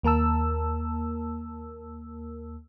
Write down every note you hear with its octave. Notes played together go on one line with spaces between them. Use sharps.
D#2 A#3 A#4 A5 E6